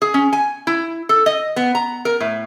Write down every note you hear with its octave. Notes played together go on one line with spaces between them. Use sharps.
G#4
C#4
G#5
E4
A4
D#5
B3
A#5
A#4
A2